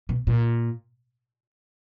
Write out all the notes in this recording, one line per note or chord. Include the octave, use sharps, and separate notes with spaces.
B2
A#2